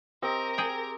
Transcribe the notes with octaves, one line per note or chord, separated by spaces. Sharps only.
C4 G4 A#4 D#5
G#4 G5